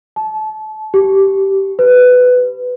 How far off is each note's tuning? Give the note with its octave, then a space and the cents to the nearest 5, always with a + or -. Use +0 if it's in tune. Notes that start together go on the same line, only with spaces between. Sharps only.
A5 -30
G4 -15
B4 +15